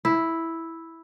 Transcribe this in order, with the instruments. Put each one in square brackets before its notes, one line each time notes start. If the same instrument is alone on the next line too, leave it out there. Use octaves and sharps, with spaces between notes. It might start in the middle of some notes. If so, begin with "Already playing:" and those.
[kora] E4